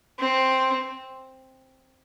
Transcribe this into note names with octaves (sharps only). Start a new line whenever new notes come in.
C4